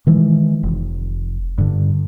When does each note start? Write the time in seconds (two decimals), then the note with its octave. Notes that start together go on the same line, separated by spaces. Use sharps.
0.07 D#3 E3 G#3
0.63 F1
1.58 G2 D3